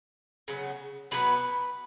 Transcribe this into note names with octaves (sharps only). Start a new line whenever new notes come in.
C#3 F#3 B3
B2 F#3 B3 B4